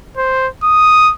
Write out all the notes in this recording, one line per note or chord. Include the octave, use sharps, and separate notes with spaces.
C5
D#6